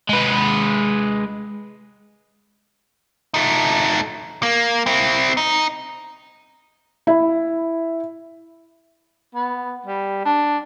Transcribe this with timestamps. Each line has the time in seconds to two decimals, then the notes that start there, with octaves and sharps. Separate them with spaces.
0.09 G#3 B4
3.34 A3 D#4
4.43 A#3
4.86 C4 E4
5.37 D#4
7.07 E4
9.35 B3
9.87 G3
10.25 D4